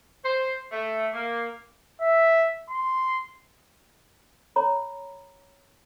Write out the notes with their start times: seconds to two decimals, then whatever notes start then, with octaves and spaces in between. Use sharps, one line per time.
0.24 C5
0.72 A3
1.14 A#3
2.01 E5
2.71 C6
4.56 C#5 A#5 B5